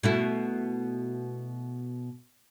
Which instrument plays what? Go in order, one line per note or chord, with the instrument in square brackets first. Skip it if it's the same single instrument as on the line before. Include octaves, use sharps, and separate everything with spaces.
[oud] B2 A3 E4